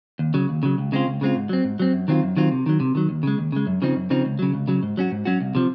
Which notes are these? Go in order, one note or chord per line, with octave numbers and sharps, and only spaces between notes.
D#2
C#3 F#3
D#2
C#3 F#3
C#2
C#3 G#3 C4 F4
C#2
C#3 G#3 C4 F4
G#2
F#3 C4
G#2
F#3 C4
F#2
D#3 F#3 C4 F4
F#2
D#3 F#3 C4 F4
C3
D#3 F#3
C3
D#3 F#3
D#2
C#3 G#3
D#2
C#3 G#3
F#2
C#3 F3 C4 D#4
F#2
C#3 F3 C4 D#4
C#2
C#3 F#3
C#2
C#3 F#3
G#2
F#3 C#4 F#4
G#2
F#3 C#4 F#4
C2
C3 F3